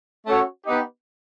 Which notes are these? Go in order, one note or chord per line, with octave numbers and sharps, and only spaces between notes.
A3 C#4 F#4 A4 C#5
B3 D#4 G4